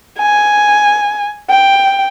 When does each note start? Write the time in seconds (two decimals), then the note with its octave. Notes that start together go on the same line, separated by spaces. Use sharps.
0.19 G#5
1.50 G5